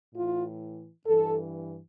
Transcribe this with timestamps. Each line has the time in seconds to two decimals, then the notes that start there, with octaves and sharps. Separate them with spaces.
0.14 A2 E3 F4
1.06 G2 E3 A4